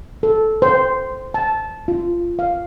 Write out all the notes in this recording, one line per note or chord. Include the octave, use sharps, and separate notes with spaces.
A4
C5
A5
F4
F5